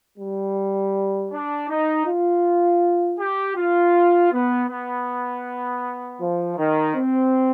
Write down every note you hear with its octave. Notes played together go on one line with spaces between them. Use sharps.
G3
D4
D#4
F4
G4
F4
B3
B3
F3
D#3
C4